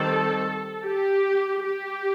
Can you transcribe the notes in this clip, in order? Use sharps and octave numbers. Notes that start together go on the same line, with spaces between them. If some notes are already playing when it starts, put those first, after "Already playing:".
Already playing: D#3 G3 C4 A4
G4
G4